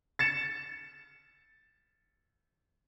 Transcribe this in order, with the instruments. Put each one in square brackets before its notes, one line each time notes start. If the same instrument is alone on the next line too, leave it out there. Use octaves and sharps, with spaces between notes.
[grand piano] A6 C#7 E7